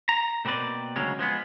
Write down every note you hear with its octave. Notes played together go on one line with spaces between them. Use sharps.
A#5
B2 A#3 C4 B4 D5
D2 C#3 F#3 G#3 C#4
F3 G#3 B3